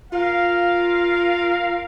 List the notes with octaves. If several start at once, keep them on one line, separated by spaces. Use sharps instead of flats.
F4 A#4 F5